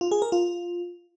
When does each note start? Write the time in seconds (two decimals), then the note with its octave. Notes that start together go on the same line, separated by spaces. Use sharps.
0.01 F4
0.11 G#4
0.22 A#4
0.32 F4